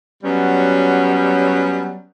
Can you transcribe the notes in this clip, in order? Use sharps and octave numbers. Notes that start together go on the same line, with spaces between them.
F#3 G3 B3 C#4